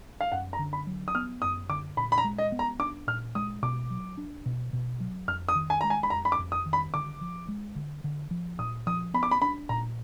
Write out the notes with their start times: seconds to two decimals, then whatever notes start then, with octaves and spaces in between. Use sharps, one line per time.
0.21 F5
0.32 F#2 F#5
0.53 A#5
0.59 D3
0.73 B5
0.87 F#3
1.08 D#6
1.15 B3 F6
1.42 F#2 D#6
1.69 D3 D6
1.97 A#2 B5
2.12 B5
2.18 A#5
2.24 G#3
2.38 D#5
2.52 B3
2.59 A#5
2.79 D4 D6
3.07 A#2 F6
3.35 G#3 D#6
3.62 B2 D6
3.91 F#3
4.18 D4
4.46 B2
4.73 B2
5.00 F#3
5.28 F2 F6
5.49 D#6
5.55 D#3
5.70 G#5
5.81 G#3 A#5
5.90 G#5
6.03 B5
6.10 F2 A#5
6.25 B5
6.32 D6
6.39 F2
6.52 D#6
6.66 D#3
6.73 B5
6.94 D3 D6
7.21 F3
7.48 G#3
7.76 D3
8.04 D3
8.31 F3
8.59 A#2 D#6
8.87 F3 D#6
9.14 B3 B5
9.23 D6
9.31 B5
9.42 D4 B5
9.69 A#2 A#5